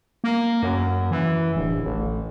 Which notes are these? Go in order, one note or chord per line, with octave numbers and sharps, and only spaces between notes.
A#3
F#2
E3
D1
A1